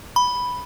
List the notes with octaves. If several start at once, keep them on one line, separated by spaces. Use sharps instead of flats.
B5